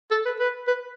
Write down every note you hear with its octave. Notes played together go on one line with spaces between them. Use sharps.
A4
B4
B4
B4